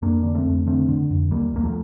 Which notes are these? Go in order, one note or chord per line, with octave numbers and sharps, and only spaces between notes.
F2 A#3 D4
D3 D4
A3 C4
F2
D3 A3 C4
D3
F2
D#2 G3 A#3
D#2 A#3
F3 A3